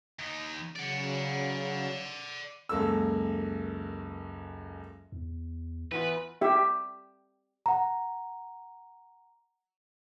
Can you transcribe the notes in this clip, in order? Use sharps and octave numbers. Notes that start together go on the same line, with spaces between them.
D#2 D#4
C#3 F#3 D5 F#5
C#2 F#2 A#3 A4 E6
E2
E3 B3 F4 B4
G4 E5
F#5 A#5